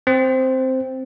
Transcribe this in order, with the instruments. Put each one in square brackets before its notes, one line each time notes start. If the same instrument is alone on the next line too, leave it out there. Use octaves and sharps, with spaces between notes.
[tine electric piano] C4 C5